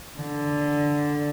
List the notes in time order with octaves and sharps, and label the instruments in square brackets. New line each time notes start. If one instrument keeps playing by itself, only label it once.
[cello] D3